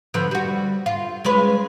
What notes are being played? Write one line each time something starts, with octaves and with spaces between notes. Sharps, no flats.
D3 F3 B3
G3 F#4
F4
G#3 C#4 B4